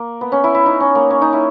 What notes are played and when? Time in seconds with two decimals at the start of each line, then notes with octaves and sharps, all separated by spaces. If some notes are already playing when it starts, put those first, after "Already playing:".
Already playing: A#3
0.21 B3
0.32 C#4
0.44 E4
0.55 E4
0.66 D#4
0.80 C#4
0.95 A#3
1.10 C#4
1.22 D#4
1.33 E4